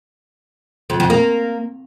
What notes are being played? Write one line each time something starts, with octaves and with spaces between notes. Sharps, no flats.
F2
F2
A#3